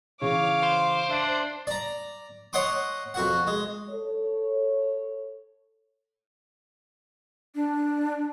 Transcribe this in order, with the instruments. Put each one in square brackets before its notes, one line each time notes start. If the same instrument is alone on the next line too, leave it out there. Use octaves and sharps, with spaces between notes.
[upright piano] C#3 E3 [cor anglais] C#5 [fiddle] F5 D6
[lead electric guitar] C5
[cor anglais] D4 [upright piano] E5 D7
[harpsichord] D5 A#5
C#5 D#5 F#5 C6 D6
F2 F#4 F#5
G#3
[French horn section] A4 C#5
[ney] D4